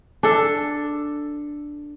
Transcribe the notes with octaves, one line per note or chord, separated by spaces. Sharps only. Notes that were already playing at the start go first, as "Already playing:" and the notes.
D4 A4